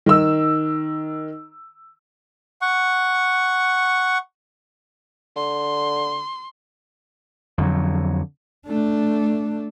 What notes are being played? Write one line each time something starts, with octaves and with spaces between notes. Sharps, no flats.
D#3 E6
F#5 C#6
D3 C6
F2 D3 F#3
A3 D4